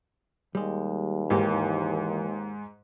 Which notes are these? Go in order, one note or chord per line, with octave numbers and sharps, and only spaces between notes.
D#2 G3 G#3
G#2 E3 A#3 G4